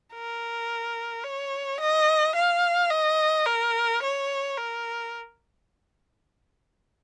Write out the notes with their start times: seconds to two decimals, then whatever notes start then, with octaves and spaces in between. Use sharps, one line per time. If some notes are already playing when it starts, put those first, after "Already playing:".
0.14 A#4
1.24 C#5
1.80 D#5
2.36 F5
2.91 D#5
3.46 A#4
4.03 C#5
4.58 A#4